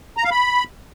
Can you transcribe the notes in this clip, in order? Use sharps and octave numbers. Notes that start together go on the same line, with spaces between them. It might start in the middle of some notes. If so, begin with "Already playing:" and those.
A#5
F5
B5